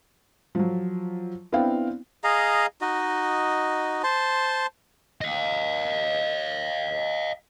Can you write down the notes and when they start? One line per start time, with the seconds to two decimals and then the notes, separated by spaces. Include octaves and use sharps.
0.55 F3 F#3
1.52 B3 C4 D4 E4 F5 G5
2.24 G#4 D#5 F5 A#5
2.81 D#4 F#4 D#5
4.04 C5 A5 C6
5.21 D#5 F5